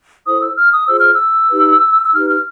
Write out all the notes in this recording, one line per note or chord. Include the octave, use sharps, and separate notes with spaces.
E4 A4 C5 D#6
E6
F6
D#6
F4 G#4 C5 E6
F6
E6
D#4 G4 B4
E6
D#4 G4 B4 F6
F6